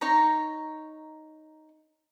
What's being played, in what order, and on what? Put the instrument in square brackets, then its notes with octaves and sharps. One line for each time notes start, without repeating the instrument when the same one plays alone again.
[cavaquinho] D#4 C#5 A#5